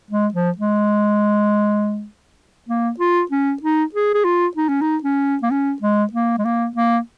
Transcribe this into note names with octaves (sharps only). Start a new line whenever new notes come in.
G#3
F3
G#3
A#3
F4
C#4
D#4
G#4
G#4
F4
D#4
C#4
D#4
C#4
A#3
C#4
G#3
A#3
G#3
A#3
A#3